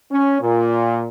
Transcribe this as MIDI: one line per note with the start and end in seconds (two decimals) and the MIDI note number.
0.12 0.38 61
0.41 1.07 46